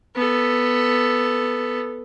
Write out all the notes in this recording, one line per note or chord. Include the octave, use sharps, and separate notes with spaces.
B3 A4